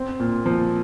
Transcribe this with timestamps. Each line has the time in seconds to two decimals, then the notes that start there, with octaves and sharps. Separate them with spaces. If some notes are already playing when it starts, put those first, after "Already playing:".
Already playing: C4
0.20 A#2
0.46 F3